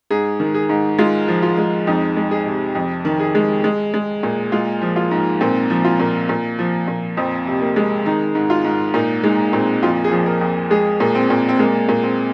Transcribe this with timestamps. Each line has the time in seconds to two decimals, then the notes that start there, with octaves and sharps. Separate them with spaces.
0.11 G#2 G#4
0.40 D#3
0.55 G#4
0.69 G#2
0.98 G#3 F4
1.28 F3
1.42 F4
1.58 G#3
1.87 F2 D#4
2.17 G#3
2.31 G#4
2.46 C3
2.75 F2
3.05 D#3
3.20 G#4
3.35 G#3
3.64 G#3
3.94 G#3
4.23 A#2
4.52 G#3 F4
4.81 F3
4.96 F4
5.11 G#2
5.41 A#2 C4
5.70 F3
5.85 F4
6.00 A#2
6.29 A#2
6.59 F3
6.88 A#2
7.17 F2 C4
7.47 C3
7.62 A#3
7.76 G#3
8.06 D#3 D#4
8.35 G#2
8.50 F4
8.64 G#2
8.94 A#2 D#4
9.24 G#3 D#4
9.53 A#2 C4
9.82 F2 F4
10.04 G#4
10.11 F3
10.26 A#4
10.41 F2
10.70 G#3 G#4
11.00 A#2
11.15 C4
11.30 A#2
11.49 C4
11.59 G#3 A#3
11.89 A#2
12.03 C4